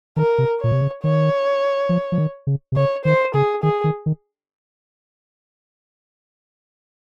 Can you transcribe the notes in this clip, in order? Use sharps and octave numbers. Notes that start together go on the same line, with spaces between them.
D#3 A#4
C3
A#2 C#5
C3
C#3
D#3 C#5
F3
F3
D#3
C#3
C3
C#3 C#5
D#3 C5
C#3 G#4
D#3 G#4
D#3
D#3